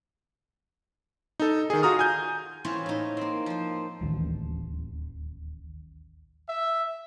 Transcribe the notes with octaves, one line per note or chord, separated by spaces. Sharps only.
D#4 A4
D#3 G#4
F4 F#4 A#5 D#6 F6
G#5 G6
E3 C4 C#4 E4 F4 C#5
A2 D#4
A#3 C4
F3 C5
D1 A1 D#2 E3
E5